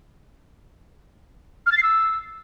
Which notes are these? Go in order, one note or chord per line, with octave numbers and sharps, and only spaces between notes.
F6
A6
C7
E6